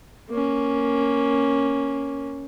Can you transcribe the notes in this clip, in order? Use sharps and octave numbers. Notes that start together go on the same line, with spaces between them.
A#3 C#4